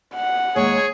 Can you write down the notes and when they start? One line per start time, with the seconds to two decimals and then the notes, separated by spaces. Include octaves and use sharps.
0.14 F#5
0.56 D#2 G#3 G#4 C#5